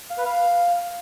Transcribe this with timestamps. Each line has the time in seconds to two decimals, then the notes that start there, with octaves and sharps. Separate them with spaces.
0.10 F5
0.18 B4
0.25 F5